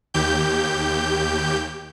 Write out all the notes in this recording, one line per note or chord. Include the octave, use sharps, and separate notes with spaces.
D#2 G4 G6